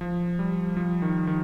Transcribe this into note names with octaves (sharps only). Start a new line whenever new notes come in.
F3
G3
F3
D#3
D#3